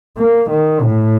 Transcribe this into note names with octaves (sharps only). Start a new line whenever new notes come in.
A#3
D#3
A2